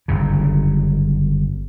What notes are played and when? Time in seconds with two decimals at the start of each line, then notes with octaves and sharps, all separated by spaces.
0.08 G1 F#2 C#3